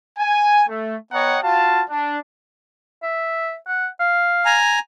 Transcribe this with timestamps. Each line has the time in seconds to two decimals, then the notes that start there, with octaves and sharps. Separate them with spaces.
0.19 G#5
0.68 A3
1.12 B3 C#5 D#5 F#5 G5 A#5
1.43 F4 F#4 F5 A5
1.90 D4
3.03 E5
3.67 F#5
4.00 F5
4.45 G#5 A#5